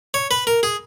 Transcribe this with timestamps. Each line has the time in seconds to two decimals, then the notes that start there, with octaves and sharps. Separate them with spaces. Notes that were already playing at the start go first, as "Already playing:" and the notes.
0.14 C#5
0.31 B4
0.47 A#4
0.63 G#4